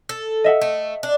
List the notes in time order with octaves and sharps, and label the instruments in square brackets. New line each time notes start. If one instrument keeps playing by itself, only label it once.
[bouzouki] A4
[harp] D#5 E5 F#5
[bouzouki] A3
D4